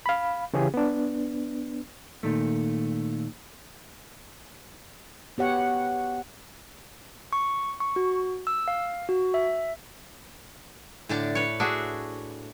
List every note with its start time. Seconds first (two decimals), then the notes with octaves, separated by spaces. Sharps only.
0.06 F5 B5
0.54 C#3 E3 C#4 G4 G#4
0.74 B3 D4
2.23 A#2 D#3 A3
5.38 B3 G4 C#5 F#5
7.33 C#6
7.80 C#6
7.96 F#4
8.47 E6
8.68 F5
9.09 F#4
9.34 E5
11.09 A2 D3 D4
11.35 B4 C#5
11.60 D4 F#4 G#4 E5